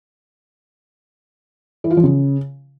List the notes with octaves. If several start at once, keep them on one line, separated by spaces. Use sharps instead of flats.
E3
F4
F3
C#3